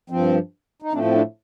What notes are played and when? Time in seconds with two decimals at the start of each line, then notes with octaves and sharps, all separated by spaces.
0.10 G2 F3 C4
0.82 D#4
0.93 A2 F3 A3 C4 D4
1.05 C4
1.14 D4